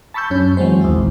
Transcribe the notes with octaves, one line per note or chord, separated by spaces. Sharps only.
A5 B5 C#6 E6 G6
F#2 C#4 G6
E3 F#3 G#3 C4 C5
D#2 G#3 E4
A#1